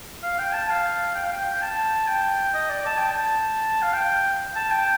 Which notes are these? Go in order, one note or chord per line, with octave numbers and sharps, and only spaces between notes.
F5
G5
A5
F5
G5
F5
G5
G5
A5
G5
D#5
D5
A5
G5
A5
F5
G5
A5
G5